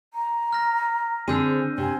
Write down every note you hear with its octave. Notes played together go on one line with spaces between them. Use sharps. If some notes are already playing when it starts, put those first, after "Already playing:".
A#5
F6 A#6
D3 C4 D4 G#4 C5 E6 G6 D#7
C3 G#5